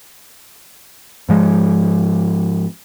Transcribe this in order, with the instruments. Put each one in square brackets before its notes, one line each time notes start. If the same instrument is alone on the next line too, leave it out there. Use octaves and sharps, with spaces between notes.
[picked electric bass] G#2 F3 G#3